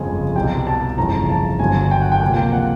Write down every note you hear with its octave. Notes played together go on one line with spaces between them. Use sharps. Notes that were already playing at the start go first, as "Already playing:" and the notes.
Already playing: G1 F2 C#3 F3 G#3 G#5
C2 B2 G3 G5
A5
G1 F2 C#3 E3 A#5
A5
G1 G2 D3 F#3 G#5
G5
F#5
G5
C#2 C3 F3 A#3 G#5
G5
F#5